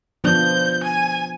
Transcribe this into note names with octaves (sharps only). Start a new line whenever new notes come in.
F3 B3 D4 G6
G#5